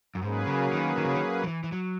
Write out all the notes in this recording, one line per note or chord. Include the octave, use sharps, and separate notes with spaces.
F#2
G#2 F#3 A#3 C#4 G#4 B4
C#3
D#3
D#3
C#3
D#3
F#3
E3
E3
F#3